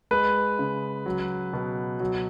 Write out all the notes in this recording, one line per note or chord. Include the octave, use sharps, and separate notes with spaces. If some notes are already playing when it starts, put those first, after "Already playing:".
G#3 B4
C#3
F#3
B2
F#3